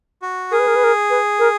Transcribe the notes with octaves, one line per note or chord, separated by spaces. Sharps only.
F#4
G#4 A#4
B4
A#4
B4
A#4
B4
A#4